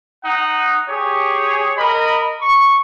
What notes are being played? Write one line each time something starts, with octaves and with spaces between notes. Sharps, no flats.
D#4 F#5
G4 G#4 C#5
A#4 D#5 B5
C#6